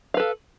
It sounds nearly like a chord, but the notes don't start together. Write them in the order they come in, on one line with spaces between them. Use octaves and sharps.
F5 B4 A4